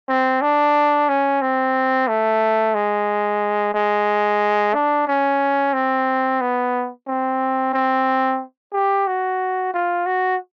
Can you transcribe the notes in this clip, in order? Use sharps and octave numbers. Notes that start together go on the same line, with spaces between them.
C4
D4
C#4
C4
A3
G#3
G#3
D4
C#4
C4
B3
C4
C4
G4
F#4
F4
F#4